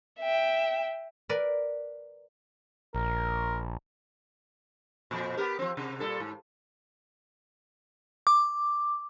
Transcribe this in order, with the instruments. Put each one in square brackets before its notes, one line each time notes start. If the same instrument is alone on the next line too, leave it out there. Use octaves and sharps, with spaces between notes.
[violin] E5 G5
[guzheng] A#4 B4 D5
[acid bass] A#1 [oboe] A#4
[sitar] F2 A#2
B3 G4 A#4
F3 C4
C3
A#2 G3 A4
G#2
[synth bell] D6